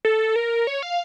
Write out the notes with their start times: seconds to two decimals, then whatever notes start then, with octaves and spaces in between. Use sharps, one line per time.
0.05 A4
0.36 A#4
0.67 C#5
0.83 F5